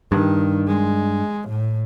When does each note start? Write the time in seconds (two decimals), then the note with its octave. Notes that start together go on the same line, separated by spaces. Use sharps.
0.12 G2 D#3
0.68 G#3
1.49 A2